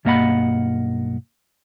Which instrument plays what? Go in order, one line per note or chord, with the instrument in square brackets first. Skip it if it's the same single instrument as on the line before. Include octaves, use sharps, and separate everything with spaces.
[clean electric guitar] B1 G2 A#3 D#5 F#5 B5